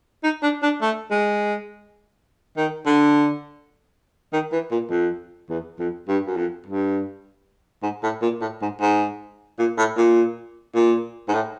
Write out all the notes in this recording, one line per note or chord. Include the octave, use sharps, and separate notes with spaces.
D#4
D4
D4
A3
G#3
D#3
D3
D#3
E3
A#2
F2
E2
F2
G2
F#2
F2
G2
G#2
A2
A#2
A2
G#2
G#2
A#2
A2
A#2
A#2
G#2
A2